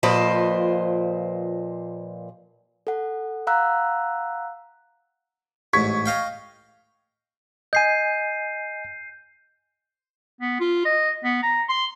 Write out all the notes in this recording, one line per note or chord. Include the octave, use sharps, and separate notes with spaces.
A#2 F3 B4 C5 D#5
A4 F#5
F5 F#5 A#5 E6 F#6
A1 G#2 C#6 G#6 B6
D#5 F5 G5
D#5 G#5 G6 C7 D#7
B3
F4
D#5
B3
A#5
C6